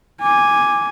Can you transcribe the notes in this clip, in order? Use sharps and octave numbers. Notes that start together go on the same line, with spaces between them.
G#5 D6